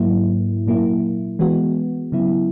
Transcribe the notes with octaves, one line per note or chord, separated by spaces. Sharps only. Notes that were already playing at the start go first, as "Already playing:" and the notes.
Already playing: G#2 F#3 A#3 E4
A#2 F#3 A#3 E4
E3 G#3 B3 F#4
C#3 F#3 B3 E4